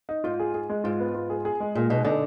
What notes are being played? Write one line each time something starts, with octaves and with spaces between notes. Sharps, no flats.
D#4
G#2 F4
G#4
G#4
G#3
G#2 F4
B3
F4
G#4
G#4
G#3
A#2 G#4
B2 D#4
D3 D#4